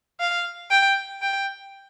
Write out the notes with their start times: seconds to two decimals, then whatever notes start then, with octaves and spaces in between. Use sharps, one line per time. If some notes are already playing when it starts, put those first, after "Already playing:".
0.20 F5
0.71 G5
1.22 G5